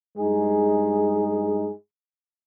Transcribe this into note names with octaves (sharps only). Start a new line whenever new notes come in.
G2 G#3 D#4 G#4